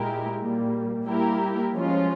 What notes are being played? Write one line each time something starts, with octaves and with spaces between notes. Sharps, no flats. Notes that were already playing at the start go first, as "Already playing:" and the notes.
Already playing: A#2 G#3 E4 G4 A#4
A#2 G3 A#3
G3 A#3 E4 G4 A#4
F3 G#3 C#4 F4